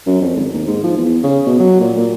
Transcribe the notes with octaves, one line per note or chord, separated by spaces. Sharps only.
F#2
F2
G#1
D#2
G#2
F3
E2
C#3
B2
F#3
A#2
A#2